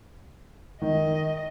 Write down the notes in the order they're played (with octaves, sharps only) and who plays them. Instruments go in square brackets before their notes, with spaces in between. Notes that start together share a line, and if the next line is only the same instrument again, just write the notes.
[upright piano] D#3 [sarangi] D#5